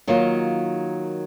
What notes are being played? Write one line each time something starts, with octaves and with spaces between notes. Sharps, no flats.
D#3 F#3 A#3 F4